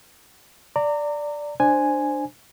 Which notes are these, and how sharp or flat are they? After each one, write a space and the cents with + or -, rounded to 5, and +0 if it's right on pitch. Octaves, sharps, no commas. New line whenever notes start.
D5 +0 A#5 -30
D4 +15 C5 +0 G#5 +0